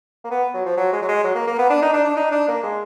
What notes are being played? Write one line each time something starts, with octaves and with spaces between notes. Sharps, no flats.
A#3
B3
F#3
F3
F#3
G#3
F#3
G#3
F#3
A#3
A#3
B3
D4
D#4
D4
D4
D#4
D4
A#3
G#3